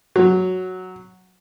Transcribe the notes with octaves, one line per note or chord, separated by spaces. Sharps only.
F#3